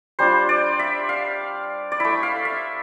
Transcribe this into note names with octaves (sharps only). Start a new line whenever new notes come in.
G3 D4 F4 C5
D5
E5
F5
D5
A3 E4 E5
F5
E5